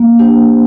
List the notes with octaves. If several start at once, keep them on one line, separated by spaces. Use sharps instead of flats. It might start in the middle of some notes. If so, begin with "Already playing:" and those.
Already playing: A#3
D4 G4 C5